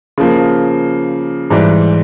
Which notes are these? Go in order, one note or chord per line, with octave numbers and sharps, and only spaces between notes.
C#3 F3 A#3
G#2 E3 G3